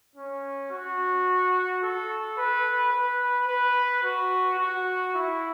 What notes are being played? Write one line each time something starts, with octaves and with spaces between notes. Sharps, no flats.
C#4
F#4
A4
B4
B4
B4
F#4
F#4
E4